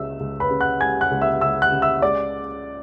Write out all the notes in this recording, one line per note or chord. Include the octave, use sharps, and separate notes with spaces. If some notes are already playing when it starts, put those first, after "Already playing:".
Already playing: C#2 G#3 E5 E6
C#2
B4 B5
C#3
F#5 F#6
G#3 G#5 G#6
F#5 F#6
C#2
E5 E6
C#2 E5 E6
F#5 F#6
C#3
E5 E6
G#3 D5 D6